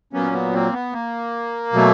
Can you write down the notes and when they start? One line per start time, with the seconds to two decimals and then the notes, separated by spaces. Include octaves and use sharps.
0.13 A#2 F#3 A#3 B3 C#4
0.33 B3
0.53 A#3 C4
0.73 B3
0.93 A#3
1.73 B2 F#3 A3